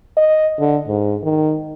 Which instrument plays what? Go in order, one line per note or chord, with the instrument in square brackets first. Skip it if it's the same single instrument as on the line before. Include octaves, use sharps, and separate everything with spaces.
[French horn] D#5
D3
G#2
D#3